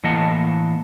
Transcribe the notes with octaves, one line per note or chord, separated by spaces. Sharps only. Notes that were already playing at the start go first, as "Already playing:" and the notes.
A2 E3 A#3 D#5 F#5 A5